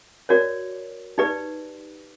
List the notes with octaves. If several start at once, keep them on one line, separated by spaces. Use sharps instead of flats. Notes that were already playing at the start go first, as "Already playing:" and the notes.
F#4 A#4 C#5 D5
D#4 G4 B4 D5